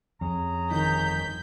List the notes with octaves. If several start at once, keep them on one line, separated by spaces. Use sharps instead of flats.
F2 C#4 G#4 A#5
G1 D#3 G6 B6